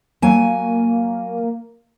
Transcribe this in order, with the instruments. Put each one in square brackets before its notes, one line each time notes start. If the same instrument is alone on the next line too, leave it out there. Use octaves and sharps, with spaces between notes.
[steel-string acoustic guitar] F#3 G#5 [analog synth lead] A#3